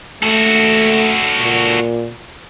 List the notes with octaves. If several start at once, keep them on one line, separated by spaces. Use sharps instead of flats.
A3 F#4 A4
A#2